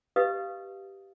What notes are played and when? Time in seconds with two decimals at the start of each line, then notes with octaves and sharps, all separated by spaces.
0.16 G4 B4 D#5 F5 D#6